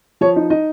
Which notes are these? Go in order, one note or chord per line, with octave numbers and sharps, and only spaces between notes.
F3 C#5
D#4
D#4 D#5